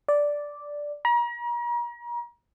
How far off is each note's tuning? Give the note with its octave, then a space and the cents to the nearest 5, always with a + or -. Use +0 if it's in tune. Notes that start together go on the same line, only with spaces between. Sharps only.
D5 -5
A#5 +35